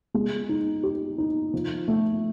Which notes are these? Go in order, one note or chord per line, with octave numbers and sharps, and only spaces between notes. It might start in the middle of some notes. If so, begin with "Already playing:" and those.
G#3
D#4
G4
D#4
F3
A3